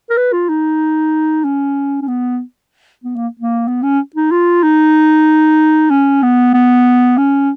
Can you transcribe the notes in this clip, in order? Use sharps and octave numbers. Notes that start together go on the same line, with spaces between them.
A#4
B4
F4
D#4
C#4
C#4
B3
B3
A#3
A#3
B3
C#4
D#4
F4
D#4
C#4
B3
B3
C#4